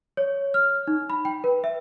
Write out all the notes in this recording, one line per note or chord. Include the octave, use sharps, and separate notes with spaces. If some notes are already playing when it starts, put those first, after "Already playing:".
C#5
F6
D#4
B5
G5
B4
E5